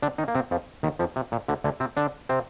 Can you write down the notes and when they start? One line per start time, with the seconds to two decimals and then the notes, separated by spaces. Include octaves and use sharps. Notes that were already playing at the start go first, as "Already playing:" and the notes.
0.02 D3 D4
0.18 D#3 D#4
0.28 A#3
0.35 C3 C4
0.51 F2 F3
0.83 D#2 D#3
0.99 F2 F3
1.16 C3
1.32 A#2
1.48 D2 D3
1.64 D2 D3
1.80 C3 C4
1.97 D3 D4
2.29 C3 C4